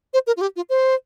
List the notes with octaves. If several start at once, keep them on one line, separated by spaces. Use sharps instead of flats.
C5
A#4
F4
G4
F4
C5